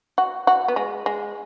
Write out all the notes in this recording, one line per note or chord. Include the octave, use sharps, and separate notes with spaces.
F#4
F#4
B3
G#3
G#3